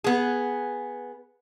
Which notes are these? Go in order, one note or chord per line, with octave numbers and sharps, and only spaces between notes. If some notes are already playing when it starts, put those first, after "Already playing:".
B3 G#4